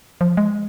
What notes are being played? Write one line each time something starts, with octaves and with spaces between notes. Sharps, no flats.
F3
G#3